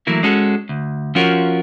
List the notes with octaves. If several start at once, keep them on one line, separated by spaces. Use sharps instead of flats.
E3 F#3 A3 A#3 E4
G#3 C#4 F#4 A4
D2
F3 C#4 F4 F#4 A#4 C#5